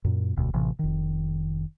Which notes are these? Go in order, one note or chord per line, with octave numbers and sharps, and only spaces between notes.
F#2 A#2
E1 D2 B2
A1 C3 E3
F1 D#3